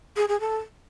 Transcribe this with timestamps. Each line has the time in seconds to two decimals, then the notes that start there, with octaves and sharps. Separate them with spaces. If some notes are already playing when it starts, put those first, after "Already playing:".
0.16 G#4
0.28 G#4
0.40 A4